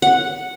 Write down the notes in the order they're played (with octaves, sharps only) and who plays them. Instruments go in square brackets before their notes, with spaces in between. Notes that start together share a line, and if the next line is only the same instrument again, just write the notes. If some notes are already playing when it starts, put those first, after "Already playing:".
[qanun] F#5